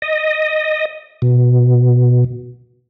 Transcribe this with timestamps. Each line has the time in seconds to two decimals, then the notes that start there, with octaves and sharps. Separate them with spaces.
0.02 D#5
1.22 B2